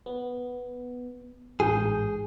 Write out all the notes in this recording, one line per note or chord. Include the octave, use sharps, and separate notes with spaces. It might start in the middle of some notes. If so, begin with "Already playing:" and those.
B3
A1 G#2 G#4 G6